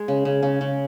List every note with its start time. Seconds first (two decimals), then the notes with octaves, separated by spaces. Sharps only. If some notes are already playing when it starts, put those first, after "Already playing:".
Already playing: G#3 G#4
0.08 C#3
0.25 C#3
0.43 C#3
0.61 C#3